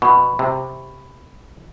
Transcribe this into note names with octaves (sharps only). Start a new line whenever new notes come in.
B2 B5 C#6
C3